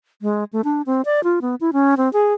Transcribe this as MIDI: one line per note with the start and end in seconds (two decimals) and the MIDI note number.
0.22 0.44 56
0.53 0.61 57
0.64 0.82 62
0.86 1.02 60
1.05 1.23 74
1.24 1.39 65
1.42 1.55 59
1.61 1.71 64
1.73 1.95 61
1.97 2.11 60
2.13 2.34 68